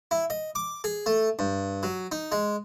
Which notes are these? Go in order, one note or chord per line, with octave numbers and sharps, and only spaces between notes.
E4
D#5
D6
G#4
A3
G2
F#3
D#4
G#3